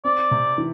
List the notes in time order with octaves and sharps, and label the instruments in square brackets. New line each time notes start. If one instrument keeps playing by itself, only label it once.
[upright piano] C4 [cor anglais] D5
[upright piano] C3
E3